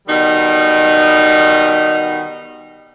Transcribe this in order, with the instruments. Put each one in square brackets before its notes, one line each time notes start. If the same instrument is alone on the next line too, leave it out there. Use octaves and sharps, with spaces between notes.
[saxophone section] B2 D#3 G3 D#4